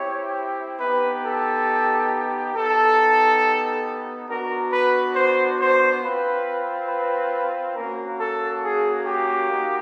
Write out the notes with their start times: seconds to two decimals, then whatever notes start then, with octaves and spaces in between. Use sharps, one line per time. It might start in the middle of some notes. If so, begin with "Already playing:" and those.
Already playing: C4 E4 G4 C#5
0.79 B3 D#4 G4 B4
1.24 A4
2.54 B3 D#4 G4 A4
4.28 B3 D4 F#4 A#4
4.71 B4
5.14 C5
5.58 C5
6.01 C4 F4 B4
6.88 B4
7.76 A#3 C#4 F#4 A#4
8.18 A4
8.63 G#4
9.05 G4
9.49 A#3 D#4 F#4